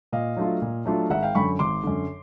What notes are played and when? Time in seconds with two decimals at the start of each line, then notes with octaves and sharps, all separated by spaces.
0.12 A#2 D#5 F5
0.37 F#3 A3 D4 F4
0.62 A#2
0.86 F#3 A3 D4 F4
1.10 G#1 E5 F#5
1.23 F5 G5
1.35 F#2 D3 B5 C#6
1.59 G#1 C6 D6
1.83 F#2 D3